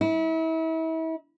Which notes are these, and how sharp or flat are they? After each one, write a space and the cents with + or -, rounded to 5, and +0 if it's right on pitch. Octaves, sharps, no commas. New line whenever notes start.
E4 -35